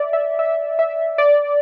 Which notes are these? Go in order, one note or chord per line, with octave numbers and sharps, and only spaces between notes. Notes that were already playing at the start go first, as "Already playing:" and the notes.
Already playing: D5 E5
E5
E5
E5
D5